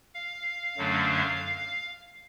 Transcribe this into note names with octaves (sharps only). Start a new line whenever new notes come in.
F5
F#2 D3 F#3 A3 D4